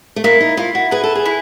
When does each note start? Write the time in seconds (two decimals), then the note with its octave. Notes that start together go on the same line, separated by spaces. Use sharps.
0.16 A3
0.24 A#3 E4
0.40 D#4
0.57 E4 F4
0.75 F#4
0.91 G#4 B4
1.04 A4
1.15 G#4
1.25 E4